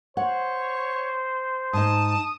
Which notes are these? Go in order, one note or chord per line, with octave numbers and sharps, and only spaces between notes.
C5 C#5 F#5
G#2 D#4 A5 D#6